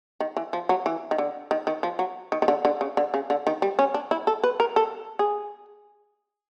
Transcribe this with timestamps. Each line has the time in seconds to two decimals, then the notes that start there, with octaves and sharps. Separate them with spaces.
0.20 D#3
0.37 E3
0.53 F3
0.69 F#3
0.86 E3
1.11 D#3
1.18 D3
1.51 D#3
1.67 D#3
1.83 F3
1.99 F#3
2.32 D#3
2.42 D#3
2.48 D3
2.65 D3
2.81 C#3
2.97 D3
3.14 C#3
3.30 D3
3.47 D#3
3.62 G3
3.79 C#4
3.94 D4
4.11 E4
4.27 A4
4.44 B4
4.60 A#4
4.76 A4
5.19 G#4